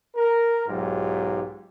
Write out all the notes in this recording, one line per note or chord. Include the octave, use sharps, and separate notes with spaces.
A#4
B1 G#2 F#3 F4 G4